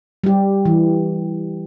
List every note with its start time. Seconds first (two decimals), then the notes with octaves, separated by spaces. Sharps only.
0.24 G3 G4
0.66 E3